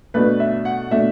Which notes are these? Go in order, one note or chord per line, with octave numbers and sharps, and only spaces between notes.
B2 A3 D4 B4
E5
F#5
B2 A3 D4 E5